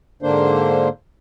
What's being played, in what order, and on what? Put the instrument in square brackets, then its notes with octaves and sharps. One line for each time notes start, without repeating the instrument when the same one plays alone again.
[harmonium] G#2 D3 A#3 D4 C5